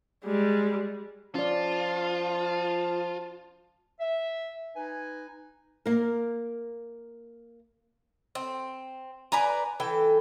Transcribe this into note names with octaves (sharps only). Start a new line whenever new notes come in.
G3 G#3
F3 C#4 F4 D5 A5
E5
D#4 B4 G#5
A#3 A#4
C4
B4 D5 G#5 A#5
E3 A4 G5